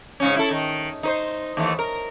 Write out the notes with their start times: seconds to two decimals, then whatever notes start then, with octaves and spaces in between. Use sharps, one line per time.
0.20 G#2 C#3 C#4
0.36 E4 A4
0.51 D#3
1.03 D#4 B4 C5
1.57 D#2 E3 A3
1.79 A#4